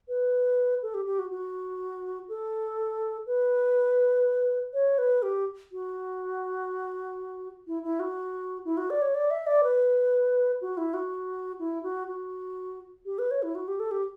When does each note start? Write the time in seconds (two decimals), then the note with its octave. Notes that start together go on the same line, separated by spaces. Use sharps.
0.09 B4
0.82 A4
0.94 G4
1.06 G4
1.19 F#4
1.31 F#4
2.29 A4
3.27 B4
4.74 C#5
4.98 B4
5.22 G4
5.72 F#4
7.68 E4
7.83 E4
8.00 F#4
8.65 E4
8.77 F#4
8.90 D5
9.02 C#5
9.15 D5
9.31 E5
9.47 D5
9.64 B4
10.61 F#4
10.77 E4
10.94 F#4
11.59 E4
11.83 F#4
12.08 F#4
13.06 G4
13.19 B4
13.31 C#5
13.43 E4
13.55 F#4
13.68 G4
13.80 A4
13.91 G4